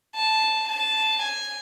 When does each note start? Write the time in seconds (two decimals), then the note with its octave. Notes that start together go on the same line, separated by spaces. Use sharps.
0.15 A5
0.68 A5
1.22 G#5